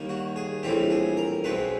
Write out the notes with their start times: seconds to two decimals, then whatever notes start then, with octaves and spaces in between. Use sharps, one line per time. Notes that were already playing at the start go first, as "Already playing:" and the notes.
Already playing: D#2 D#3 G3 A#3
0.09 F#4
0.36 G#4
0.63 A#1 A2 E3 G3 C4 G4
0.90 G#4
1.17 A#4
1.44 B1 B2 G#3 C4 B4